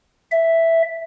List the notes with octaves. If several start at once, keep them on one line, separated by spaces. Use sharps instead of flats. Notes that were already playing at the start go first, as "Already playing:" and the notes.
E5